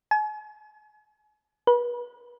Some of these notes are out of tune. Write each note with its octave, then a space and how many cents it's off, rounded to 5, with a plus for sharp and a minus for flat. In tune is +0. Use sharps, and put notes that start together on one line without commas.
G#5 +40
B4 -35